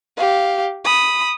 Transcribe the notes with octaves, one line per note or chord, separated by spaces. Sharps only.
G4 F5
B5 D#6